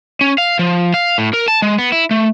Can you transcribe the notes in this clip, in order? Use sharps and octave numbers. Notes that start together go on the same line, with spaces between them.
C#4
F5
F3
F5
A2
A#4
A5
G#3
B3
E4
A3